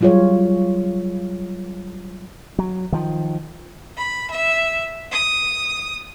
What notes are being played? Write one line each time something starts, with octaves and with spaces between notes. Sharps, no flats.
F#3 G3 F4 G#4 C#5
F#3
D#3 F3
B5
E5
D#6